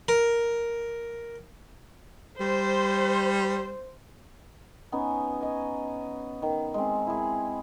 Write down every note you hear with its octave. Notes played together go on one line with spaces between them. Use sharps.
A#4
G3 C5
B3 C#4 D#4
D#5 G#5
D#3
G#3 C4
E4 G#4